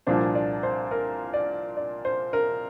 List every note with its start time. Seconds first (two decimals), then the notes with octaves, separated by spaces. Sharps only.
0.07 C2 A#2 F3 A#3 D4 C5
0.35 D5
0.63 C5
0.91 A#4
1.33 D5
1.77 D5
2.05 C5
2.33 A#4